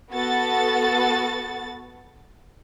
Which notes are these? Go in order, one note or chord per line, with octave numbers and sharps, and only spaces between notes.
B3 F#4 A4 A6